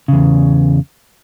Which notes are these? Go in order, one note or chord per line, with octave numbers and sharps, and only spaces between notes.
E2 C#3